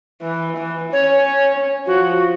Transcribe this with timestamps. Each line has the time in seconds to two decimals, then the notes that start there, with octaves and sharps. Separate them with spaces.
0.22 E3
0.57 E3
0.93 C#4 C#5
1.87 F3 F#4